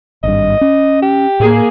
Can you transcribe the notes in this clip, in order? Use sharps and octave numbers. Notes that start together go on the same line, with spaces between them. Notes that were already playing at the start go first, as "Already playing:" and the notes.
G#1 G2 D#5
C#4
G4
A2 A#3 G#4